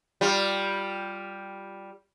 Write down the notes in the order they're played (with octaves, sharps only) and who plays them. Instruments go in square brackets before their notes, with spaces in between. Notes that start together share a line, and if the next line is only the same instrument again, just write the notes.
[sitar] G3 F4